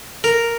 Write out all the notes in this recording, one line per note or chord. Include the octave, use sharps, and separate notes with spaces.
A#4